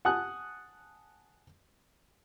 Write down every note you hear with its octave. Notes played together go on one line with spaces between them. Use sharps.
F#5 G#5 A5 D#6 F#6